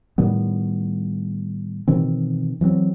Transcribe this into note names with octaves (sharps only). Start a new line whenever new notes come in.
A2 D#3 G3 B3
B2 D#3 E3 C4
E3 F#3 A3 C4